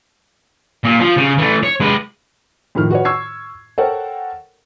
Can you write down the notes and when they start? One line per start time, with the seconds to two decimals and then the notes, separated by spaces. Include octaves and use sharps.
0.84 A#2
1.00 F3
1.17 C#3
1.38 E3 A3
1.63 C#5
1.80 G#3 B4
2.75 F2 A2 D#3 F6
2.90 F#4 B4 C#5
3.05 C#6 E6 G#6 C7
3.78 A4 A#4 C5 C#5 F#5 G5